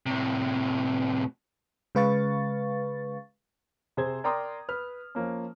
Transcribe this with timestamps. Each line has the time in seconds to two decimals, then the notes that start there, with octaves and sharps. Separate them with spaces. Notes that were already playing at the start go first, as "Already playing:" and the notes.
0.06 A2 C3
1.95 C#3 G#3 B4 F5 C#6 A6
3.97 C3 G#4 C5 G#6
4.24 A#4 D5 G5 A#5 C6 D#6
4.69 B4 F6
5.15 F3 A#3 C#4